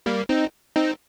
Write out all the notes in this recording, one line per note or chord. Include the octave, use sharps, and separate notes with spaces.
G3 A#3
C4 D#4
C4 D#4